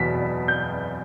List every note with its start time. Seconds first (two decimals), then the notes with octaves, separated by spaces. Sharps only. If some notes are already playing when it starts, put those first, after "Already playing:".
Already playing: E2 B2 F#3 B6
0.48 G6